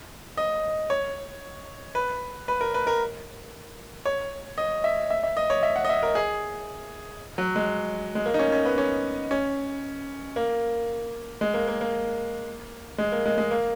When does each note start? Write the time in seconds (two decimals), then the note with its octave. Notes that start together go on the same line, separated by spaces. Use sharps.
0.37 D#5
0.90 C#5
1.95 B4
2.48 B4
2.61 A#4
2.74 B4
2.87 A#4
4.06 C#5
4.58 D#5
4.84 E5
5.10 E5
5.23 E5
5.37 D#5
5.50 C#5
5.63 E5
5.76 F#5
5.85 D#5
5.89 E5
6.03 A#4
6.15 G#4
7.38 F#3
7.56 G#3
8.15 G#3
8.26 A#3
8.34 D#4
8.39 C#4
8.52 C#4
8.65 B3
8.78 C#4
9.31 C#4
10.36 A#3
11.41 G#3
11.54 A#3
11.67 A#3
11.81 A#3
12.98 G#3
13.12 A#3
13.26 G#3
13.38 G#3
13.51 A#3